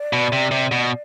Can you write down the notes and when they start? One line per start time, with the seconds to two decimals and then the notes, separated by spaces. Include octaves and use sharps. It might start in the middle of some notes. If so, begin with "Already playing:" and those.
Already playing: D5
0.13 B2
0.33 C3
0.51 C3
0.72 B2